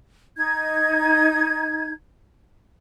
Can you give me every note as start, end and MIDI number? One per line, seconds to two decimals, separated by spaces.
0.36 1.92 63
0.36 1.92 92